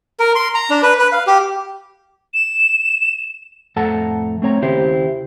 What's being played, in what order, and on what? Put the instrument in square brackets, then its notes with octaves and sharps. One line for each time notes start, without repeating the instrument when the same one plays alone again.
[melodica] A#4
C6
A#5
D4
B4
B4
F5
G4
[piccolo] E7
[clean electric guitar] F2 A2 A4 F#5 A5 A#5
A3 C4 C#5 A#5
D#2 C#3 E4 G4 C5